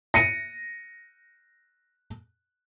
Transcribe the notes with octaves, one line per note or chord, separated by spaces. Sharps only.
A#6 C#7 D#7